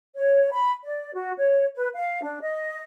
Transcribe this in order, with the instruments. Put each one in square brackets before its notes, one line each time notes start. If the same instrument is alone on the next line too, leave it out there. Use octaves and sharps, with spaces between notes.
[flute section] C#5
B5
D5
F#4
C#5
B4
F5
D4
D#5